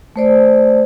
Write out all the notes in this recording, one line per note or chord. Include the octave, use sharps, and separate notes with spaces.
A3 C5 D5